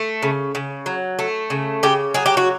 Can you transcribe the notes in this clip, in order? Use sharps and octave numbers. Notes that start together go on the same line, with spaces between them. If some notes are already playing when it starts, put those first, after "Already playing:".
Already playing: A3
C#3
C#3
F#3
A3
C#3
C#3 G4
F#3 G#4
G4
F#4